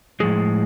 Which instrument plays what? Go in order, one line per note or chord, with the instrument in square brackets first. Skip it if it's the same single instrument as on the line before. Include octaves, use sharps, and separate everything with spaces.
[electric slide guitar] A2 F3 G#3 G#4